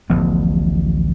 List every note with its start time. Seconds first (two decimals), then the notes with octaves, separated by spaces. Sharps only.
0.10 D1 A1 F3 B3